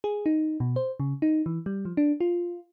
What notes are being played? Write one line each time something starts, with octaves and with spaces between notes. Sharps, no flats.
G#4
D#4
B2
C5
C#3
D#4
E3
G3
F3
D4
F4